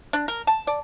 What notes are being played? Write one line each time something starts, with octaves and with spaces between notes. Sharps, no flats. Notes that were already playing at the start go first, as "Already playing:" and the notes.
D4
A#4
A5
D5